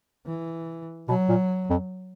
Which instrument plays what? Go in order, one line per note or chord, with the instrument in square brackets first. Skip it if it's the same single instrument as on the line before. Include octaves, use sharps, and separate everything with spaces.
[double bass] E3
[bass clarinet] B2 [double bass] F#3
[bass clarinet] A#2
F2